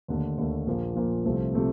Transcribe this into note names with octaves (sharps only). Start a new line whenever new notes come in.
D#2 D3 A3
D#2 D3 A3
A#1 A#2 F3 A#3
A#1 A#2 F3 A#3
C2 C3 F3 A3 C4
C3 F3 A3 C4